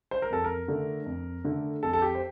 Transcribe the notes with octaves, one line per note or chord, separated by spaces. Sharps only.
C5
A#4
F2 A4
A#4
D3 A3 D4
F2
D3 A3 D4
F2 A4
A4
G4
C5